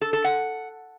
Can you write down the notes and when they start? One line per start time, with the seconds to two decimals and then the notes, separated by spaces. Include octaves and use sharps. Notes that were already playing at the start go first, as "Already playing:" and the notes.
0.01 A4
0.13 A4
0.24 F#5